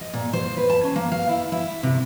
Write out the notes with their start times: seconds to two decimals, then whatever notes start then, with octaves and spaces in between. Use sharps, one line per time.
0.01 D#5
0.14 A#2
0.33 C5
0.57 B4
0.69 A5
0.84 C#4
0.96 A#3
1.12 F5
1.29 E4
1.52 E4
1.83 C3